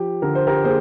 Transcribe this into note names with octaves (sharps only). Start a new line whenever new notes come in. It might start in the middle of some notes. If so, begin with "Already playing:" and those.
Already playing: F3 G4
D3 A#4
C5
G4 A#4
A#3 G#4 C5